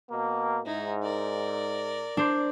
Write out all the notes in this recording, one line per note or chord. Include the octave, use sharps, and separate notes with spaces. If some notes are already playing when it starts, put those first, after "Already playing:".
B2 A#3
G#2 D#4 E4
A#4 D5
D4 C5